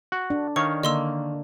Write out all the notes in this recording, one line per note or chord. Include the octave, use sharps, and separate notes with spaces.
F#4
D4
D#3 C#5 F5 C#6
D3 A#3 D#5 C6 E6